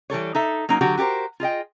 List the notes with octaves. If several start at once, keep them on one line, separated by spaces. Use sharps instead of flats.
E3 G3 A4 C#5
D#4 A4 E5
F#3 A#3 C#4 D#4
D3 F#3 F#4 G4
F#4 G4 A4 A#4 C5
F4 G#4 D#5 G5